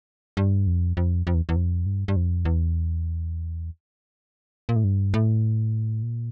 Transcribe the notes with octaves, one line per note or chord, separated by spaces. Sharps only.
G2
F2
F2
F2
E2
E2
F2
G2
G2
F2
E2
A#2
A2
G2
A2
A#2